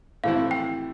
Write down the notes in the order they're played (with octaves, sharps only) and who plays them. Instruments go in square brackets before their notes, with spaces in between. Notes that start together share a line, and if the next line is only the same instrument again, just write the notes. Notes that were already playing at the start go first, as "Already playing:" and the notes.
[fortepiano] A2 E3 A3 C4 E4 [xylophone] F5
[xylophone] G5